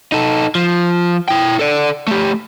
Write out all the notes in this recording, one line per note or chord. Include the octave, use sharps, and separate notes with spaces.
D#4 A4
F3
E4 G5
A4 D5
A3 G4